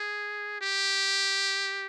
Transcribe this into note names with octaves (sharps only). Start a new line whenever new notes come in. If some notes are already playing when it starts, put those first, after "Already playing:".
Already playing: G#4
G4